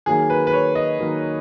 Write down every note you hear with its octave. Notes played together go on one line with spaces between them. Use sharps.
D#3 F#3 A#3 G#4
B4
B4
C#5
D#5
D#3 F#3 A#3